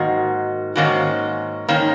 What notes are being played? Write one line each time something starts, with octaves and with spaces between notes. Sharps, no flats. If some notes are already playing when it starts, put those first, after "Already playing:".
Already playing: G#2 D#3 A#3 F#4
G#2 D#3 A#3 C#4 F#4
G#2 D#3 A#3 C#4